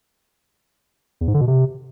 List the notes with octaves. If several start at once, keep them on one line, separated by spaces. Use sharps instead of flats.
E2
G#2
D3
B2
C3